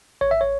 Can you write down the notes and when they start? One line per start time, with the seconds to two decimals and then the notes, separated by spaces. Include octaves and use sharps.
0.21 A1 C#5
0.31 E5
0.41 C#5